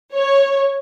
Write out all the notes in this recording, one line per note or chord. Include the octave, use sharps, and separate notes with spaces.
C#5